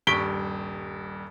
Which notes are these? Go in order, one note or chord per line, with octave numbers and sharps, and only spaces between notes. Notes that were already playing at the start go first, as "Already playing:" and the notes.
D#1 G2 C#6 B6 D7 G7